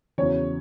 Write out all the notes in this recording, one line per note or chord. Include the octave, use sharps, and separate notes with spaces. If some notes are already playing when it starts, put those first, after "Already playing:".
E2 C#3 F#3 C#5